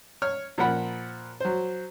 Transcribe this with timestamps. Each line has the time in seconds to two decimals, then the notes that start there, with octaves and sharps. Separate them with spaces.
0.22 C#5 F6
0.58 A#2 F3 A#4 F#5 B5
1.40 F#3 C5